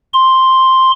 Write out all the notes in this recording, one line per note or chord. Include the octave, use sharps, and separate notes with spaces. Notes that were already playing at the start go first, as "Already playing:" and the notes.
C6